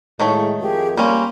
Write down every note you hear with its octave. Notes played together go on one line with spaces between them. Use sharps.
A2 D#3 G#3 A3 C#5 F5
F2 F4 G4 G#4 A#4
G3 A#3 C#4 A#5 C6